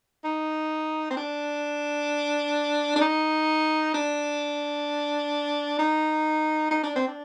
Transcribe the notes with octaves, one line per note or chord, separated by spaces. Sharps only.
D#4
C4
D4
D4
D#4
D4
D#4
D#4
D4
C4
D4